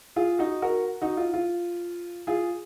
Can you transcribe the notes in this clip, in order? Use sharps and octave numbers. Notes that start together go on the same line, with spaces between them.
F4 G#4
D#4 F#4
F#4 A#4
D#4 F#4
F4
F4
F4 G#4